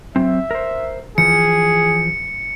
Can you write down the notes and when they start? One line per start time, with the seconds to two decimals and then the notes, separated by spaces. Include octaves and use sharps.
0.16 F#3 C4 E5
0.51 A#4 C5
1.18 E3 F3 G#4 C#7